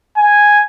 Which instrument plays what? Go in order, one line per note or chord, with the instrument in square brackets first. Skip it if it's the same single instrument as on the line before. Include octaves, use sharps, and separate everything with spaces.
[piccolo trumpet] G#5